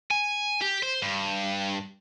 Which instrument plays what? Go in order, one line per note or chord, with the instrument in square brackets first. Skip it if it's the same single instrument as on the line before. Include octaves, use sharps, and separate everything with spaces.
[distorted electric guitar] G#5
G4
C5
G2